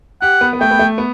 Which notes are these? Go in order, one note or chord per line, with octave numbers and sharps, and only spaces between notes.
G4 F#5
B3
B3
A3 G5
B3
A3
B3